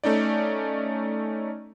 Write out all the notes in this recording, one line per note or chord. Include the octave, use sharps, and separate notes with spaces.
A3 C#4 D#4 D5